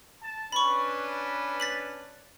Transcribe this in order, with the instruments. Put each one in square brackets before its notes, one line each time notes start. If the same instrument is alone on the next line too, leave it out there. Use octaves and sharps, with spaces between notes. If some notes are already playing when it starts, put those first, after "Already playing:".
[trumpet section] A5
[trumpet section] C#4 D4 B4 [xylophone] B5 C#6
[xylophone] A6 B6 F#7